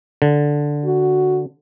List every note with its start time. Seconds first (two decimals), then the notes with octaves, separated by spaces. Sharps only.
0.22 D3
0.85 F#4